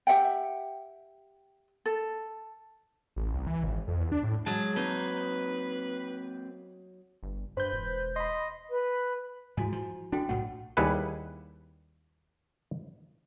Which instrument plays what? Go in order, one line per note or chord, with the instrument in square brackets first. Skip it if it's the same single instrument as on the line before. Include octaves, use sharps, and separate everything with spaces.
[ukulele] G4 E5 F#5 G5
A4
[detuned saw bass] A1
C2
E3
G#1
F2
E2
D4
A2
[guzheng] F#3 [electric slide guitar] G#3 [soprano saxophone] A5
[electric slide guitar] A#3 C4 [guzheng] D#4 [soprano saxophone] B4
[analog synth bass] G1
[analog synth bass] G2 [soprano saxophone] B4 [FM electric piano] C5 G6
[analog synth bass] E1
[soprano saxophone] D#5 [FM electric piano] B5 C6
[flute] B4
[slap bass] G#2 F3 [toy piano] E4 F#4 G#5
[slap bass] F3
[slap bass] D4 [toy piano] F#4 A4 G5
[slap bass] B1 A2 A3 [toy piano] F#5
[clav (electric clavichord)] D#2 G3 E4 G#4 B4 F#5